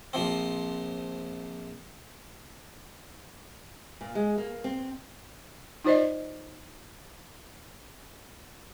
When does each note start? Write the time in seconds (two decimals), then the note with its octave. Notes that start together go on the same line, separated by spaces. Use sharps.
0.13 A#1 F3 C4
4.01 A#2
4.15 G#3
4.38 A#3
4.64 C4
5.85 D#4 F4 C5 D5 D#5